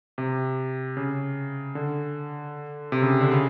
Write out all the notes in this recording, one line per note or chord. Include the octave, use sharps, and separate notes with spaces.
C3
C#3
D3
C3
C#3
D3
C#3